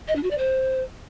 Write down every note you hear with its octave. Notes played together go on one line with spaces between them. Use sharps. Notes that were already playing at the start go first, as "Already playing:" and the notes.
D#5
D4
F#4
D5
C5